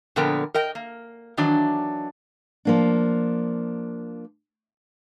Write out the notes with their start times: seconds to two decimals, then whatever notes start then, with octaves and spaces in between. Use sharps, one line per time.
0.16 A#2 D3 F3 B3 A#4 G5
0.54 A#4 D#5 G5
0.75 A#3
1.37 D#3 E3 F#3 D4
2.65 F3 A#3 D4